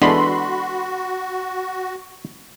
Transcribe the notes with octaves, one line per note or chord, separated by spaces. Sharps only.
E3 G#3 B3 D4 F#4 A4 B5 C6